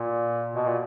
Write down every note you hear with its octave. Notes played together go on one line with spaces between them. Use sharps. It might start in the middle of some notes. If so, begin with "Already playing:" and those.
Already playing: A#2
B2
A#2